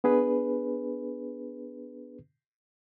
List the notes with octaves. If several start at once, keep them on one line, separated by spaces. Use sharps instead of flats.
B3 D4 G#4 B4